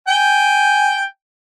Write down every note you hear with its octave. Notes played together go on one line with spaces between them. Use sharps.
G5 G#5